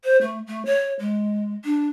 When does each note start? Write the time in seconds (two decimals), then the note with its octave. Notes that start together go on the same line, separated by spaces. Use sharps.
0.04 C5
0.21 A3
0.47 A3
0.65 C#5
1.00 G#3
1.64 D4